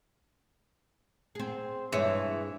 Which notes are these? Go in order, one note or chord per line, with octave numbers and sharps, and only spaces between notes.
C4 G#4
G2 E3 G#3 C#5